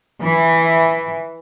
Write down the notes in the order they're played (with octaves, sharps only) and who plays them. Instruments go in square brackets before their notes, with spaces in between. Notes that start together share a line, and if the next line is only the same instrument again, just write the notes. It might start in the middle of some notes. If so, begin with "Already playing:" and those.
[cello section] E3